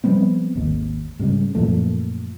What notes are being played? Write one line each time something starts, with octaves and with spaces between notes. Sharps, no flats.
F3 G3 B3 C4
G#1 D#2
G#2 C#3 G3
F#2 A#2 F3 A3